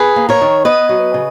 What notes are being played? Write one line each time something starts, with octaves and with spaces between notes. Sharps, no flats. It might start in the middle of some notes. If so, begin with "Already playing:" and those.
Already playing: G#4 B4
A#3
A#4 C#5
D#3
B3 B4 D#5
F#3
C#3